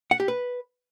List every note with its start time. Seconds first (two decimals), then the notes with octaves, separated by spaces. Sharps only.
0.11 F#5
0.20 G4
0.28 B4